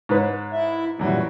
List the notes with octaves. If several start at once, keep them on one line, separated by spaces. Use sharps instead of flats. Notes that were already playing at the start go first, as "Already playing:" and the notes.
G#2 B4 C#5
E4 E5
F#2 A#2 E3 G3 F#4